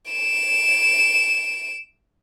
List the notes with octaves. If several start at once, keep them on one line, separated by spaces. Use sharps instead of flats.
D7 E7